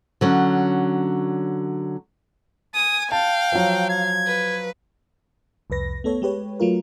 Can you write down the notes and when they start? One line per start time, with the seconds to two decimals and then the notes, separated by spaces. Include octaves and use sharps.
0.21 D3 F#3 C#4
2.74 G#5 D#6
3.12 F5 G5 A5
3.52 F3 F#3
3.90 G#6
4.27 B4
5.70 C2 F2 B4 A#6
6.04 A3 B3 A4 C#5
6.22 G#3 G4 B4 C#5
6.60 F#3 A3 F4 A#4